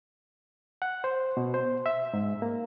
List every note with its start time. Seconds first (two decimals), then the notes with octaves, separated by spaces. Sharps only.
0.82 F#5
1.04 C5
1.37 B2
1.54 C5
1.86 E5
2.14 G#2
2.42 A#3